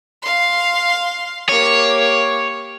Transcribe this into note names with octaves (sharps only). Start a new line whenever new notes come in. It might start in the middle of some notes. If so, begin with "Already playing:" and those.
F5 C6
A#3 G4 C#5